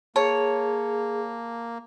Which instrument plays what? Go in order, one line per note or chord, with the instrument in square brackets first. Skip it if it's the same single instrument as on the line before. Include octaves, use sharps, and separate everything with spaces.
[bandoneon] A#3 [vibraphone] G#4 [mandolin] C#5 [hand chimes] A5